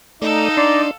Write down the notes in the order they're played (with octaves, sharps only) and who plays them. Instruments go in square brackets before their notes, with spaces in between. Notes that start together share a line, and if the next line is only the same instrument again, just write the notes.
[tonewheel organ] A3 D5 [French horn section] D#4 [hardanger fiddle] A4 F5
[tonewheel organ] D4 C6 [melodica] D5